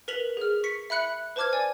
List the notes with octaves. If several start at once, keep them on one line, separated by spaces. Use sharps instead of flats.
A#4 B4 B6 F7 F#7
G#4 F6
C#6 B6 C#7
E5 B5 F#6 C#7 F#7
B4 C5 A5 D6 F6 G#6
D5 G#5